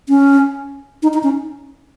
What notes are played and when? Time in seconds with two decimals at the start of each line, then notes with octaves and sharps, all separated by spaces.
0.09 C#4
1.03 D#4
1.14 D#4
1.23 C#4